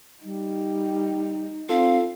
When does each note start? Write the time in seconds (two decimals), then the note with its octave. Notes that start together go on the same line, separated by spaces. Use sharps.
0.24 G3 D#4
1.69 C4 F4 A4 F5